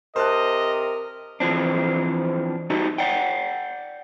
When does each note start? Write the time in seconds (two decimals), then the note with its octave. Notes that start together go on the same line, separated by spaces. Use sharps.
0.16 C3 A#4 C5 D#5 A5 F#6
1.40 E3 F3 C4 D4
2.70 G3 D#4 F#4
2.98 D5 F#5 G5